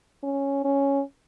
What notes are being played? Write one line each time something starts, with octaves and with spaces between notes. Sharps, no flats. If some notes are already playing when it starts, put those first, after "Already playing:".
C#4
C#4